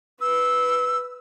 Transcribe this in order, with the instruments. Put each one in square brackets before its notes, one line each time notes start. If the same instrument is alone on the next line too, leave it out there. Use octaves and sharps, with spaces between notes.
[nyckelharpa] B4 [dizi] E6